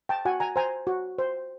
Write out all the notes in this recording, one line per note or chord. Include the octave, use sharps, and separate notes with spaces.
G5 A5
F#4 F#5 G#5
G#5 A#5
C5 G#5 A#5
F#4
C5